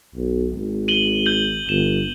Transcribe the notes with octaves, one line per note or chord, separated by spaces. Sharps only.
B1
G#1
D#7 F#7 G7
G6 F#7
G1 E7